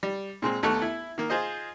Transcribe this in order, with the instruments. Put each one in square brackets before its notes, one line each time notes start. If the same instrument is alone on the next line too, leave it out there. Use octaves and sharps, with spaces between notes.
[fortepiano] G3
A#2 G#3 C4
D#2 A3 B3 A4 C#6 F#6
E4
D#3 A#3
F4 G#4 C5 D#5